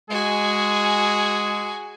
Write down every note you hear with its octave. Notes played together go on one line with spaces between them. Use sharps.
G#3 F#4 G#4 G#5